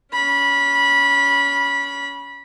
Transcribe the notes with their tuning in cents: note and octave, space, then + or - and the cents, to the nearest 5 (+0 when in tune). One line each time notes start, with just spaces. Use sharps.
C#4 +25 B5 -20